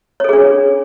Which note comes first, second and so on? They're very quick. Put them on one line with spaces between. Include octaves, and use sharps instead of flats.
C#5 A4 G#4 D4